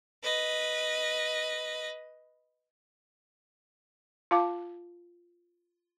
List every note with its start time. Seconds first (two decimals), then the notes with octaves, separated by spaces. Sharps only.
0.23 B4 D#5
4.31 F4 F5 A5 D6